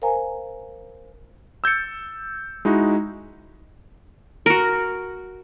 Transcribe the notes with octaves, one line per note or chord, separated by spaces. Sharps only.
A#4 C5 F5 G#5 A#5
E6 G6 A6 C#7
G#3 D#4 E4 F#4
F#4 A#4